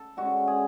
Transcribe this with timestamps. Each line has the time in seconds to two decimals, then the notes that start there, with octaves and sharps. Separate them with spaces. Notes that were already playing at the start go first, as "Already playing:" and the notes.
Already playing: A4
0.17 D3 G#3 C#4 F#4
0.48 G#4